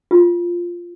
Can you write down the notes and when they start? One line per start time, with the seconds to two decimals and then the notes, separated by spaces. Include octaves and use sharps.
0.11 F4